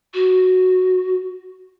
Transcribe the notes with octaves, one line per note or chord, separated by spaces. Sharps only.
F#4